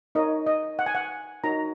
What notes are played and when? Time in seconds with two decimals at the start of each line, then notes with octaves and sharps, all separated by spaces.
0.15 D#4 A#4 C#5 D#5
0.46 D#5
0.79 F#5
0.86 G#5
0.95 F#5
1.44 D#4 F#4 A#4 C#5 A#5